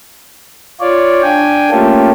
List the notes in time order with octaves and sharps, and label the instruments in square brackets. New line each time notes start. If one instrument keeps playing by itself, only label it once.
[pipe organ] F4 C#5 D5
D4 G5 G#5
A3 A#3 C#4 F4 G4 A4